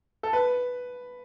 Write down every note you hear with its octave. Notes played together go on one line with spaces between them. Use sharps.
A4
B4